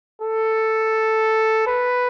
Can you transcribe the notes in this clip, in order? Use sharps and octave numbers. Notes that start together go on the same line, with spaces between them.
A4
B4